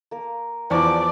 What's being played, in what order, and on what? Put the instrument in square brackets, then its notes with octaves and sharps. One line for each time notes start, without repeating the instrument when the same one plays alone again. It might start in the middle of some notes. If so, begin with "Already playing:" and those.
[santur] A#3 A#4
[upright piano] E2 F3 C#6 [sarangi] D5 [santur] F#5 A5